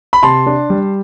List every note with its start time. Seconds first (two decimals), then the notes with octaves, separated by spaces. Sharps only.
0.13 B5
0.23 C3 A5 C6
0.47 D4
0.70 G3